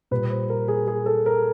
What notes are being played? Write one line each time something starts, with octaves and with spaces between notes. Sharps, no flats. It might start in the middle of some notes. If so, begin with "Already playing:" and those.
A#2 G3 B4
C5
A#4
G#4
G#4
A4
A#4